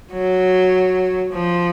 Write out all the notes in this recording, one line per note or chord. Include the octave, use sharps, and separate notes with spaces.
F#3
F3